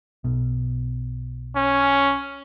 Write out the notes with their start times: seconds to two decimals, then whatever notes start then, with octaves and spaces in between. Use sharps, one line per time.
0.24 B1 B2
1.56 C#4